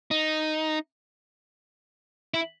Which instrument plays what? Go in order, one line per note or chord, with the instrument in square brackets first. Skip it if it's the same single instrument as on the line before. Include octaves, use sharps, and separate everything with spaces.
[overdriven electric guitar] D#4
E4